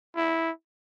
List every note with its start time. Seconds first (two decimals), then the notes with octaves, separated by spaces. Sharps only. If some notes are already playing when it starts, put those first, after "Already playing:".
0.16 E4